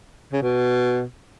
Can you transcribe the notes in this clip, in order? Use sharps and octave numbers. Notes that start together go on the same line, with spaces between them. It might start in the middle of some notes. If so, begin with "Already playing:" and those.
C#3
B2